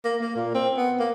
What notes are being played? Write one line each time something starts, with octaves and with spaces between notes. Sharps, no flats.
A#3
A#3
A#2
C4
B3
A#3